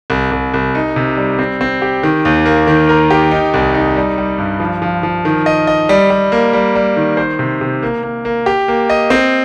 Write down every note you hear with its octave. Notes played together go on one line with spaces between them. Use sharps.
C2
C2
C2
D#4
C3
G3
C4
C4
G4
D#3
D#2
A#3
D#3
A#4
G4
D#4
C2
D#4
G3
G3
G2
F3
F3
F3
D#3
D#5
D#5
G3
G3
A#3
G3
G3
D#3
C5
C3
C3
A#3
A#3
A#3
G4
A#3
D#5
C4